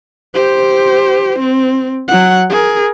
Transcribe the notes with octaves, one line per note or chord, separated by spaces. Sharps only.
G4 C5
C4
F#3 F#5
G#4 A#4